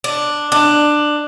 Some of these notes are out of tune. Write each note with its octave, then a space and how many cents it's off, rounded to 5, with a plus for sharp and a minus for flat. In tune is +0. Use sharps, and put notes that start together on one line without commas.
D4 +5
D4 +15